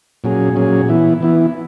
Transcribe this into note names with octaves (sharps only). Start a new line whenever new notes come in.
A#2 F#3 C#4 G#4
A#2 F#3 C#4 G#4
E3 B3 E4
E3 B3 E4